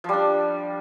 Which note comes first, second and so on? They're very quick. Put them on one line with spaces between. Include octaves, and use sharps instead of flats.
F3 G3 D4